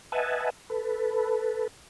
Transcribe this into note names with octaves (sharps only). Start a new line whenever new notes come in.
B4 D#5 E5 F#5 G#5 A5
A4 B4